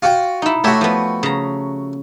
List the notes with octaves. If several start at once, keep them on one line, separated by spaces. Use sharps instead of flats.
F4 F#4 G5
D#4 E4
A3 F#4 G4 C#5 E5
F3 B3
C#3 A#5